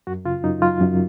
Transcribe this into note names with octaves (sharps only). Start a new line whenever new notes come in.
F#2 F#4
C#3 F4
F#2 D#4
F#3 F4
F#2